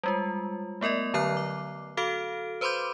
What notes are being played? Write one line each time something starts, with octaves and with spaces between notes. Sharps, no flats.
G3 G#3 F4
A3 B3 A#4 D5 D#5
D3 F#3 A#5 F6 F#6 C7
D6
F#4 A4 F5 F6 D7
B4 C5 B5 C6 D6 G6